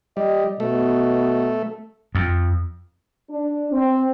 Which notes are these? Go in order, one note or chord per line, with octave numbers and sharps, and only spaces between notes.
G3 D#5
B2 A3
F2
D4
C4